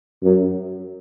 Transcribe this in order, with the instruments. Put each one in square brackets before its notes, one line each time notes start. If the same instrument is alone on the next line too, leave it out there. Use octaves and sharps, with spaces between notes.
[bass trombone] F#2